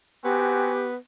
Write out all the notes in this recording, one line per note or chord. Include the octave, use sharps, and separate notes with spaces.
B3 C4 F#4 G4 G#5